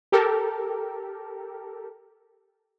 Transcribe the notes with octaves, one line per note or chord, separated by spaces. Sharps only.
G4 A4 A#4